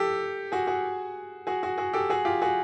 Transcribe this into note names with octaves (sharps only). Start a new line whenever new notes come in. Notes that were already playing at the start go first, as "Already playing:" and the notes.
Already playing: G4 A4
F#4 G#4
F#4 G#4
F#4 G#4
F#4 G#4
F#4 G#4
G4 A4
F#4 G#4
F4 G4
F#4 G#4